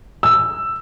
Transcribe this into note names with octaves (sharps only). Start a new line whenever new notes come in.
E6